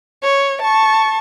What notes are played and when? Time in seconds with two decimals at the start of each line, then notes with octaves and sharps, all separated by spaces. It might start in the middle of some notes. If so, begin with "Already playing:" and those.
0.23 C#5
0.62 A5 C#6